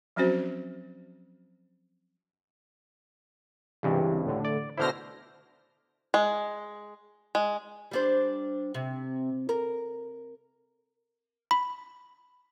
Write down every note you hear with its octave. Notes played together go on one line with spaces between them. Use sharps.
F3 F#3 C4 C#4 F#4 C5
C#2 G2 C3 E3
A2 D3
D5
B2 D3 E4 C5 F6 A#6
G#3
G#3
G3 D4 C5
C3
A#4
B5